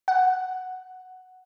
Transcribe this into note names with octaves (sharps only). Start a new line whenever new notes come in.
F#5